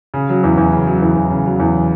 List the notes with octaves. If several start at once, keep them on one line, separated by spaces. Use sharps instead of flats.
C#3
F#3
E2
E2
C#3
F#3
E2
E2
C#3
F#3
E2